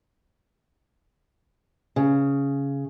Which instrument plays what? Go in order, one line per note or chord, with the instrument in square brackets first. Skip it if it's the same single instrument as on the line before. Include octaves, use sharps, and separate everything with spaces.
[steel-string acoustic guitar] C#3